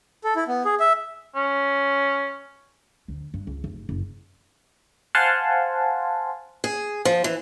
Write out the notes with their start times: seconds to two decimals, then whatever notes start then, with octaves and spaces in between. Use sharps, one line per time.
0.24 A4
0.36 E4
0.48 B3
0.65 G#4
0.80 E5
1.36 C#4
3.08 D2
3.34 G2
3.47 C#2
3.64 F1
3.89 F#1
5.15 C5 F5 F#5 G#5 A5 C6
6.64 G#4
7.05 F3
7.24 E3